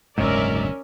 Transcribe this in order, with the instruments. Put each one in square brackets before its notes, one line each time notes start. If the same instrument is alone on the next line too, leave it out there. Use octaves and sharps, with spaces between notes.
[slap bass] F#1 D2 B2 [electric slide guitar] G#2 [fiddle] C#4 [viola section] A#4 D5 E5